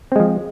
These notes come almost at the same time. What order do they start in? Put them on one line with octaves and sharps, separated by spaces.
C4 G#3 F3